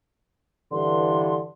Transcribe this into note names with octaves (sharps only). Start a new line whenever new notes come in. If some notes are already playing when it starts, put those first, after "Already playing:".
G2 D3 E3 C6